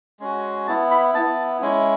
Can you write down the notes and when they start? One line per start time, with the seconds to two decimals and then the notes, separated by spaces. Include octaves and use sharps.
0.20 G#3 C#4 F#4
0.67 B3 E4 A5
0.91 B5
1.15 B3 E4 A5
1.62 G#3 C#4 E4